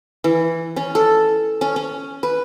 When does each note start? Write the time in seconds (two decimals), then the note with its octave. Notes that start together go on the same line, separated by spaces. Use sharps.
0.24 E3
0.76 C#4
0.95 A4
1.61 C#4
1.76 C#4
2.23 B4